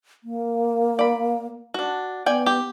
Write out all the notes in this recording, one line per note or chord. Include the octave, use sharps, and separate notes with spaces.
A#3
D5 B5
D4 F#4
B3 D5 G5 G#5
G4